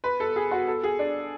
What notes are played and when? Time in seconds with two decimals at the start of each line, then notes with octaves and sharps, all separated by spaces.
0.04 B4
0.20 A4
0.36 G#4
0.51 F#4
0.68 A4
0.83 G#4
0.99 D4